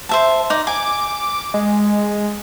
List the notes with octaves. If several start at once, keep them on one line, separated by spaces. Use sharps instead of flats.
C5 E5 A5
D#4 D5
G#5 D6
G#3